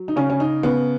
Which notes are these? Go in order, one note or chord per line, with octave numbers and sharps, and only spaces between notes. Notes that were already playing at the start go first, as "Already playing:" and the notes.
Already playing: F#3
D#4
C#3 C#4
C#4
D#4
C#3 B3